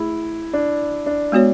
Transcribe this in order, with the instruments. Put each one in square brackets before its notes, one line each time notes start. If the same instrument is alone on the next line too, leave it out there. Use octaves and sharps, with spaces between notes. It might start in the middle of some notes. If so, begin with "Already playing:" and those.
Already playing: [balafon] A3 G#4 [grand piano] E4
[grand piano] D4
D4
[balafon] G#3 B3 F#4 C#5